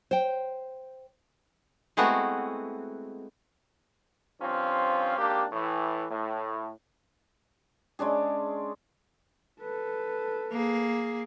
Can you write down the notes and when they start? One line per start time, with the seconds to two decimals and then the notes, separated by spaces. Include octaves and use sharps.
0.11 C5 G5
1.97 G#3 A3 B3 C4 E4 F#4
4.41 G2 F3 C4 C#4 F4
5.18 G#1 A#3 D4 G4
5.52 A2 E3
6.11 A2
7.99 G#3 C#4 D4 G#4
9.60 A4 B4
10.53 A#3 G#4